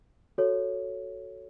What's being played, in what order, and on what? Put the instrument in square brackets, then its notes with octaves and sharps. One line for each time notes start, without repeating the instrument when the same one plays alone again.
[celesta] F#4 A4 C#5